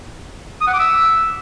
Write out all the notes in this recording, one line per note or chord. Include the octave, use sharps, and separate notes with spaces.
D#6
F#5
D6
E5